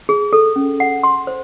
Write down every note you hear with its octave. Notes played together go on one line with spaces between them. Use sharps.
G#4
A4
C#4
F#5
C6
C5